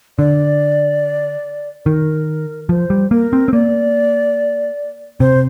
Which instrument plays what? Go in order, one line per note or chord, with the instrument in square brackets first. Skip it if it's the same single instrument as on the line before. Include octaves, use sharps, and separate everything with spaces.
[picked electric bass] D3 [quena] D5
[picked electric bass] D#3 [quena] A#4
[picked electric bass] F3 [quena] C5
[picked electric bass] G3
[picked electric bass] A#3 [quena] A#4
[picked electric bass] C4
C4
[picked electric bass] A#3 [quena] D5
[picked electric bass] C3 [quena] C5